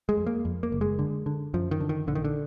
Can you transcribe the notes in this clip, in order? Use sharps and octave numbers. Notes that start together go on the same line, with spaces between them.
G#3
F2
A#3
F2
A#3
F#1
G#3
D3
D3
F#2 F3
D#3
D3
D#3
A#1 D3
D#3
D3